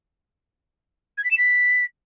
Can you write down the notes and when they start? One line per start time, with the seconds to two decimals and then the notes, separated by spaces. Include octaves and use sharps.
1.17 G#6
1.24 B6
1.30 E7
1.37 B6